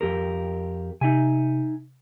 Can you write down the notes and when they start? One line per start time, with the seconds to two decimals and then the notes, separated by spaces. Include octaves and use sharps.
0.01 F2 G4 A#4
1.01 C3 D#4 E5 G#5